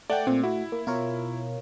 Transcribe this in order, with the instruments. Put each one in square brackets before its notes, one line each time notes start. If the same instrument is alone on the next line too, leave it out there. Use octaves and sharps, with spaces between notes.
[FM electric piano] A3 [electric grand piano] D5 F#5 G5
[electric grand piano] A#2 [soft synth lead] C4
[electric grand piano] E4 [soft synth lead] F#4
[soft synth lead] A#3
[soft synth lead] B2 [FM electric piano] F4 A#4 C#5